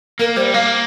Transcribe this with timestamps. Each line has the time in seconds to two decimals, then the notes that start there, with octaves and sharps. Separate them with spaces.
0.19 A#3 A#4
0.36 G3 C5
0.54 A#3 F5